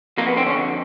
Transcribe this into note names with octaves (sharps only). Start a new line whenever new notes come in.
F2 A#3
B3
D3 C4
C#4
F2